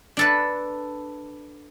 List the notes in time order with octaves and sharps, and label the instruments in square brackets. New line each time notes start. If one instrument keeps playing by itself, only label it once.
[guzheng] D4 A4 B4